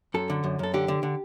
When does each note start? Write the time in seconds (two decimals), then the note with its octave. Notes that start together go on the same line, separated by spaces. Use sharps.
0.14 F#2 A4
0.30 D3
0.44 F#2
0.59 F#2 A4
0.74 D3 G4
0.88 D3
1.03 D3